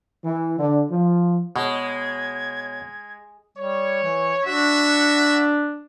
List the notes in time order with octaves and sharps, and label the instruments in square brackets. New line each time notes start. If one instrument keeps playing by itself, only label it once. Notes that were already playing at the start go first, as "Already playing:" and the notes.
[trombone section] E3
D3
F3
[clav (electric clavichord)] B2 [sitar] G#3 [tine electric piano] C#5 F#5 [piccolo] G#6
[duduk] G3 [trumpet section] C#5
[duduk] E3
[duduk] D4 [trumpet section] F#4 [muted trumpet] E5